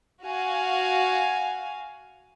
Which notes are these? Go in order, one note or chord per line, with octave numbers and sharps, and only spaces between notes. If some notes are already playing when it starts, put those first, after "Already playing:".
F#4 F5 G#5